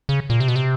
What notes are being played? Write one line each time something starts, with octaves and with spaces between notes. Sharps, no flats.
C#3
A#2
C3
B2
C3